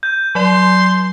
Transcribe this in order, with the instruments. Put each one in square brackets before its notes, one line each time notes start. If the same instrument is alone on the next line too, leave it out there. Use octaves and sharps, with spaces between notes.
[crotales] G6
[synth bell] F#3 D5 [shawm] C6